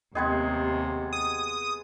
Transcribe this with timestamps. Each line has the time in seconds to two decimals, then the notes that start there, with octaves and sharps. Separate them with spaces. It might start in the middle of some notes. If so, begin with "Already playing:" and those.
0.15 D#2 C3 G#3 B3 G#4 D#5 G5 G#6
1.13 D#6